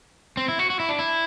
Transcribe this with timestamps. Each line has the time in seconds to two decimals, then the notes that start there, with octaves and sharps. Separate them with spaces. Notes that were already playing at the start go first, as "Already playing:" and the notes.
0.37 C4
0.48 E4
0.59 F#4
0.70 F#4
0.80 E4
0.89 D4
0.99 E4